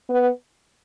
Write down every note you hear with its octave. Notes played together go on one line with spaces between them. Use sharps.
B3